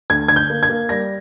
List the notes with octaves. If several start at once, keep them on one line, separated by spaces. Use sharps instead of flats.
D2 G#6
D3 G#6
G6
A#3
G#6
A#3
G3 A#6